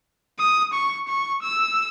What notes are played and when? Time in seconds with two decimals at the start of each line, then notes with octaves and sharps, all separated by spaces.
0.39 D#6
0.73 C#6
1.08 C#6
1.42 E6